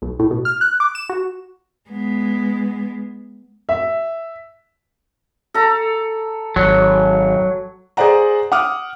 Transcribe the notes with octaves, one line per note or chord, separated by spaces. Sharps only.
B1
A2
B2
F6
F#6
D6
E7
F#4
G#3 B3
E5
A4 A#5
G#1 F#3
G#4 C5 D5 F#5 A#5
F#5 D6 D#6 F6